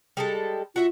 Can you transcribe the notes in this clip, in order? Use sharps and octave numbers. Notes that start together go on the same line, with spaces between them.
G3 G#3 A4
F4 F#4 E5 F#5